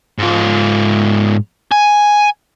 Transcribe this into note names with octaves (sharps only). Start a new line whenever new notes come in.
G#2 F4
G#5